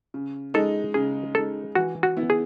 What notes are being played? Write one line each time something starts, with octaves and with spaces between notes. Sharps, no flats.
C#3
G#3 D#4 A4
C#3 G#4
G#3 D#4 A4
E3 F#4
F#4
B3 E4
G#4